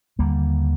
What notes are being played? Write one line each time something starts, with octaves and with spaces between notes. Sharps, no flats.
D#2 D3 G3 A#3